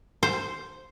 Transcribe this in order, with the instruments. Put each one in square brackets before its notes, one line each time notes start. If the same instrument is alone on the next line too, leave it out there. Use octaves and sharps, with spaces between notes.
[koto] C5